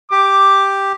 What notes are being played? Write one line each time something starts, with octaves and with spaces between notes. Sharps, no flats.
G4 D6